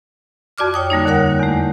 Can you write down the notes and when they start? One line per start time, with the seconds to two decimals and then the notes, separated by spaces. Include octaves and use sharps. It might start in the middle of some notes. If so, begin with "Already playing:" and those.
0.58 F2 F#4 D5 D6 F6
0.74 C#5 G5 D#6
0.90 D3 G3 A#3 D#4
1.05 D#2 D3 A#4 C#5 F#5
1.39 E2 A3